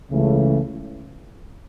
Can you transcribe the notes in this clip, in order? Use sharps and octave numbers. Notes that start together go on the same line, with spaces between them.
C#2 C#3 E3 A3